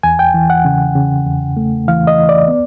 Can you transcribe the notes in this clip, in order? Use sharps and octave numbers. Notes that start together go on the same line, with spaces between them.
E2 G#5
G5
E3
F#5
C#3
C#3
E2
A3
E3 F5
D#5
E3
D5
B3